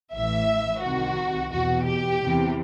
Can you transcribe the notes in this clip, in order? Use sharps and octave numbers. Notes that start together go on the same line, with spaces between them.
A1 A2 E3 E5
C2 C3 D#3 F#4
E2 B2 F#4
G4
E2 C3 E3